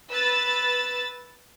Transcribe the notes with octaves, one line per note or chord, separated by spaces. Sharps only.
B4 E6 A6